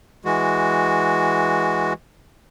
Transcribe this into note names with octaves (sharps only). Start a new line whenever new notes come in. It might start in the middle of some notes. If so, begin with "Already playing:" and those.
E3 G#3 F#4